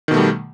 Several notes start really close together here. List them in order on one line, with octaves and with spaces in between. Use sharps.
D#3 B2 A3 G3